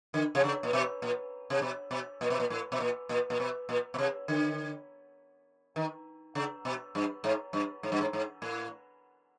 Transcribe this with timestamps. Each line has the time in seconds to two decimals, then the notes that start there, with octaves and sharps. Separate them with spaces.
0.14 D3
0.35 C3
0.44 C#3
0.63 A#2
0.73 B2
1.02 A#2
1.50 C3
1.62 B2
1.91 B2
2.21 A#2
2.30 B2
2.40 A#2
2.50 A2
2.72 B2
2.80 A#2
3.09 A#2
3.30 A#2
3.40 B2
3.69 A#2
3.94 B2
3.98 C3
4.28 D3
5.76 D#3
6.35 C#3
6.65 B2
6.95 G2
7.24 G#2
7.53 G2
7.83 G#2
7.92 G2
8.01 G#2
8.13 G#2
8.42 A2